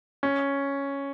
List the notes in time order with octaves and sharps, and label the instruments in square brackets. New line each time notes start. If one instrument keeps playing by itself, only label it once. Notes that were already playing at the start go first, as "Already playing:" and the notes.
[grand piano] C#4